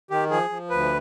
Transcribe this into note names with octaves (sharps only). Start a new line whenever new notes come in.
D#3 G4
F3 G#4
F3
D2 B4